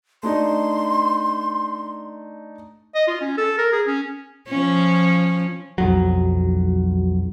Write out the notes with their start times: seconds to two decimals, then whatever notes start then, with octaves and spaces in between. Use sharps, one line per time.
0.23 A3 D4 D#4 C6
2.95 D#5
3.07 F4
3.21 C#4
3.38 A4
3.58 A#4
3.73 G#4
3.87 C#4
4.48 F3 C#4
5.78 B1 F2 F#3